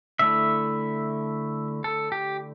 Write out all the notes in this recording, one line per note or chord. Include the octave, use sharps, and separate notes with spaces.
D3 A3 E4 E5
A4
G4